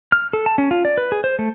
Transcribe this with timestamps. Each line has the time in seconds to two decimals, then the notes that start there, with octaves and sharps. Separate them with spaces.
0.12 F6
0.33 A4
0.46 A5
0.58 C#4
0.71 F4
0.85 D5
0.98 B4
1.12 G#4
1.24 C5
1.39 A3